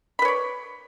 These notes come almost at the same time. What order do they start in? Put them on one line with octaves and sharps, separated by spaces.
B5 B4 C#5 D5